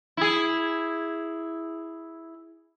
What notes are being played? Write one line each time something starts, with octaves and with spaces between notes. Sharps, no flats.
E4 G#4